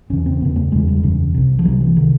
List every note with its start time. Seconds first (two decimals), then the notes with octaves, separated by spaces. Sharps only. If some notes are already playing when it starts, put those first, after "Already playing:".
0.10 F#1 E2 C#3 C#4
0.26 C4
0.41 F#1 E2 C#3 B3
0.56 A3
0.72 F#1 E2 C#3 G#3
0.88 G3
1.03 F#1 E2 C#3
1.34 C2 C3
1.59 F3
1.65 C2 C3 F#3
1.81 E3
1.96 C3 D#3